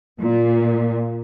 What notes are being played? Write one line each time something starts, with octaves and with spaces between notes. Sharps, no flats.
A#2